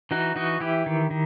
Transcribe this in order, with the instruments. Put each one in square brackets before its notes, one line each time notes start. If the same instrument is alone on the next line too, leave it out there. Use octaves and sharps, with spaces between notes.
[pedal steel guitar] E3 D#4 F#4
E3 D#4 F#4
E3 E4 G4
D#3
D#3